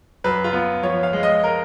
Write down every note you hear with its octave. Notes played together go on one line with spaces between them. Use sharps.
F#2 B4
F4
B3
F3 C#5
F5
G#3
D#5
A#4